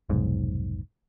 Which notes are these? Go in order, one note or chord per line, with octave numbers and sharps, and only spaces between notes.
F1 B1 G#2